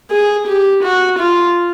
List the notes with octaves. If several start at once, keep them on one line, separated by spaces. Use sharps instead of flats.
G#4
G4
F#4
F4